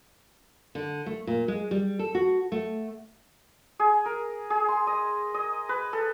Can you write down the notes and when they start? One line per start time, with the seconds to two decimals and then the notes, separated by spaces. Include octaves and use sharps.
0.75 D3
1.06 A3
1.27 A#2
1.48 G#3
1.71 G3
1.99 A4
2.15 F#4
2.52 A3
3.79 G#4
4.06 A#4
4.50 G#4
4.68 C6
4.87 D#5
5.34 D#5
5.69 B4
5.93 A4